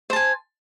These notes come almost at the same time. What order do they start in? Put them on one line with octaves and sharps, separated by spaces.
C5 A5 G#5